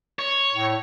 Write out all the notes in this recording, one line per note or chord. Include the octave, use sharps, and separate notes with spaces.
C#5
A2